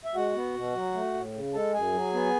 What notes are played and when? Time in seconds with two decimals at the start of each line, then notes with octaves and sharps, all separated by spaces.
0.05 E5
0.15 G#3 F#4 F#5
0.36 B3
0.55 B2
0.75 F#3
0.94 A3
1.14 A2
1.33 C#3
1.54 G#3 A4 A5
1.73 F#2 G#4 G#5
1.93 F#3
2.13 B3